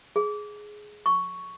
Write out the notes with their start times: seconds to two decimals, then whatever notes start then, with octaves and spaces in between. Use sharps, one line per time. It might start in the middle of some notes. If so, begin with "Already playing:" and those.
0.16 G#4
1.06 C#6